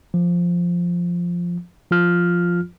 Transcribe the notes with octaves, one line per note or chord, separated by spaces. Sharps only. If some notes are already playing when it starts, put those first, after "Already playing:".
F3
F3 F4 F6